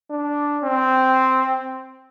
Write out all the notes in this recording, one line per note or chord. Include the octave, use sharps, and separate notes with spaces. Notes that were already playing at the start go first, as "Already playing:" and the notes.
D4
C4